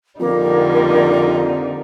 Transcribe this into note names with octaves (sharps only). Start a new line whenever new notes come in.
F2 D3 G3 A#3 D#4